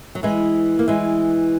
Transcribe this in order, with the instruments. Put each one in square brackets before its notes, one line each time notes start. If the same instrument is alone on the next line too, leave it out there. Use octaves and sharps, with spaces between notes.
[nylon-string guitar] F#3
E3 G#3
A#3
E3 G#3